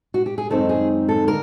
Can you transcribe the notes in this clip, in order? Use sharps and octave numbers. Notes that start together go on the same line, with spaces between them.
F#4
G4
G#4
F#2 D#3 G#3 C4 D#4 A4
G#4
A4
D3 A#4